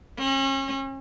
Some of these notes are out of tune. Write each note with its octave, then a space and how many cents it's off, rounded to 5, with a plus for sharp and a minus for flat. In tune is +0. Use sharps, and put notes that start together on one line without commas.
C#4 -40